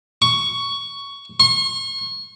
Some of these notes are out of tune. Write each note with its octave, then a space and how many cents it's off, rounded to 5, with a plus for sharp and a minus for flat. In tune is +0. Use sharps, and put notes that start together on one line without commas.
C#6 +10
C#6 -45